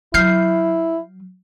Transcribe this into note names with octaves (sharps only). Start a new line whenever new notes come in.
F#3 E4 F6 G6 C7